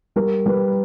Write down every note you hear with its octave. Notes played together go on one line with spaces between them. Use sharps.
G3 A#4
G3 B4